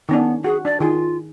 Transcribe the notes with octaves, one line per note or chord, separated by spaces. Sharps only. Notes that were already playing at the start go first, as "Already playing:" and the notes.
D#3 B3 C#4 D4
F#4 G#4
D4 D5
D#3 F4 G#4